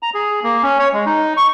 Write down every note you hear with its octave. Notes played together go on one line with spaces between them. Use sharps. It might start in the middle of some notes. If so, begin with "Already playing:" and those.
A#5
G#4
A#3
C#4
C#5
G#3
D#4
C#6